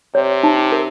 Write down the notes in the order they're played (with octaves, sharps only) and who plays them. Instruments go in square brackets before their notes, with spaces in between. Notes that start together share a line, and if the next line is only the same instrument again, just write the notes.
[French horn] C3 [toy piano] C#5
[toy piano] D#4
A#4